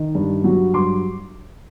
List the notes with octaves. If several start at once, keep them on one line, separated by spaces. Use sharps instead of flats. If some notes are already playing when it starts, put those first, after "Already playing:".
Already playing: D#3
G2
F#3
G2 C6 D6